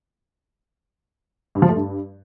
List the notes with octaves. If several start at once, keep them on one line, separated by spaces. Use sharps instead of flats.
G2
F3
A3
G2